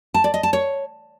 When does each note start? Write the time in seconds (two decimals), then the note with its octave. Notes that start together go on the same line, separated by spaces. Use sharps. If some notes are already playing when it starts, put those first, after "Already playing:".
0.14 A5
0.24 D5
0.34 D#5
0.43 A5
0.53 C#5